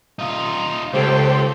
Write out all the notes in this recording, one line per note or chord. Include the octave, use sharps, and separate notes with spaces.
D#4 F4
C#2 G4 A4 C5 G5